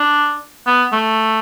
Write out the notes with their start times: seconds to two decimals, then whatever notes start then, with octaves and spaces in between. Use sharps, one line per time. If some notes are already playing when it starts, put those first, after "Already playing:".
Already playing: D4
0.67 B3
0.92 A3